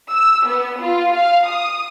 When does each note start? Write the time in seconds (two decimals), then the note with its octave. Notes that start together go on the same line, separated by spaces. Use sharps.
0.11 E6
0.47 B3
0.81 F4
1.15 F5
1.48 D#6